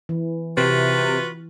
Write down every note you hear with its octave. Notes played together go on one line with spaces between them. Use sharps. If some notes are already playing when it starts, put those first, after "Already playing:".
E3
C3 F4 F#4 B4